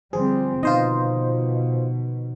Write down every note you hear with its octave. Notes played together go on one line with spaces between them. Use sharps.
D3 F3 G3 C4 G#4 C5
B2 B3 D#4 F4 C5 D#5